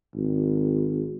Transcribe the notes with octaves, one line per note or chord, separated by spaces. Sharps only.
G#1